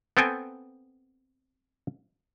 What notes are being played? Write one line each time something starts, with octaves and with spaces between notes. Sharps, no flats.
B3 C4 A4 G5 G#5